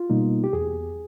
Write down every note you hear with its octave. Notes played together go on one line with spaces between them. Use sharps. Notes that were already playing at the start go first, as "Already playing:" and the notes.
Already playing: F4
B2 G3 A#3 D#4
G4
E2 G#4